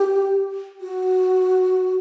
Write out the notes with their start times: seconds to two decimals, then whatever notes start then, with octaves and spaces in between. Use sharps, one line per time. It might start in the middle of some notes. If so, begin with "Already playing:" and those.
Already playing: G4
0.81 F#4